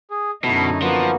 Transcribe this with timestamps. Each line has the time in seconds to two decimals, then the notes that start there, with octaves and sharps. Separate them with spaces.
0.11 G#4
0.44 F#2 B2 D3 A3 D#4 E4
0.82 F3 A#3 B3 F#4